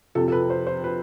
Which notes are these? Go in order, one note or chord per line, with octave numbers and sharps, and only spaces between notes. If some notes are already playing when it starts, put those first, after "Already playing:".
F2 C3 F3 A4
A4
B4
C5
C5
B4